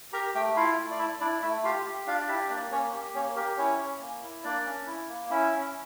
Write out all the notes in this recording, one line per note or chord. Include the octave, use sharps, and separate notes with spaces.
G4 A#4 A#5
A3 G4 G5
E4 F4 F5
A3
D5
E4 E5
D4 E4 D5
A3 E4 E5
F4 G4 F5
G4
D4 F4 F5
D5
E4 G4 E5
A#3 D4 D5
A#3 C#4 C#5
G4
A#3 C#4 C#5
G4 A#4
C#4 E4 C#5
C#4
A#3
E4
A#3 D4 D5
C#4
E4
A#3
C#4 E4 E5
C#4